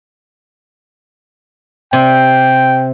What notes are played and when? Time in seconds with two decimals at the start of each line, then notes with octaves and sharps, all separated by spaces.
1.93 C3 G5